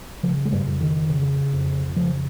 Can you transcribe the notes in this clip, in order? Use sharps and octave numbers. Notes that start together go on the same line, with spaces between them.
C#3 F3
G#3
G2 G3
F2
D#3
C#3
F2
C#3 F3